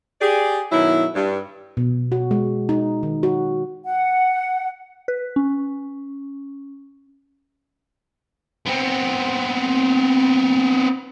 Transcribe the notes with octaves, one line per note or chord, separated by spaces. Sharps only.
G4 G#4 D5
B2 D#3 F#3 E4
G2
B2
F#4
G#3
D#4
D#3
F#4
F#5
B4
C#4
B3 C4